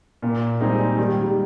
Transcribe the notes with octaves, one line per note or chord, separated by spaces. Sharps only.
A#2 A#3
G3 G#3 C4 D#4 G#4
D#3 G3
G#3
G3